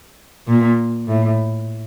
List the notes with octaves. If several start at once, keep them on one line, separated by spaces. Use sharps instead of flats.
A#2
A2